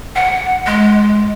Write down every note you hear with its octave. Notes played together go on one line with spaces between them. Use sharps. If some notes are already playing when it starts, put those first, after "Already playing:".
F#5
G#3